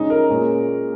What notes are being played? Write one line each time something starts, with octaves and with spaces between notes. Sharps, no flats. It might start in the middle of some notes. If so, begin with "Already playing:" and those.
Already playing: C#3 G#3 C#4 D#4
A#4
A#2 G#3 C#4